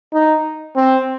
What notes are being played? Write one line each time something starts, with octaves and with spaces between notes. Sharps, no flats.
D#4
C4